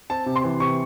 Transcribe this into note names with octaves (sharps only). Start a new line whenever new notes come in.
C4 A5
C3
C6
E3
C3 C#6